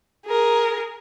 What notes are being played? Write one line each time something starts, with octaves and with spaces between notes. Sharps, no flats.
G#4 A#4